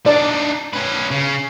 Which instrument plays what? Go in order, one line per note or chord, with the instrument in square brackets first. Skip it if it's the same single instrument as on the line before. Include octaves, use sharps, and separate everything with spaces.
[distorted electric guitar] D4 D#4 [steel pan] D5
[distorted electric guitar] C#4 B4
C#3